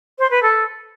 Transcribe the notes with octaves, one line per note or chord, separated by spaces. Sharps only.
C5
B4
A4